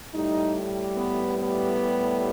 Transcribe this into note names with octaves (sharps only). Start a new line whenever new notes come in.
A2 G3 D#4
B3
B3